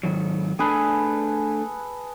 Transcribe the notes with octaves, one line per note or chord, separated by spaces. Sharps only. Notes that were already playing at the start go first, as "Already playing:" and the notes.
G#2 D#3 F#3
A3 D4 G#4 A4 B4 G#5